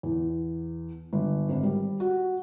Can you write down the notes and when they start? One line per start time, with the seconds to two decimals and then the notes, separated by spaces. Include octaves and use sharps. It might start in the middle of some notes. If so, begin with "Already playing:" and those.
0.03 E2
1.13 G1
1.49 G#1
1.63 G3
2.00 F#4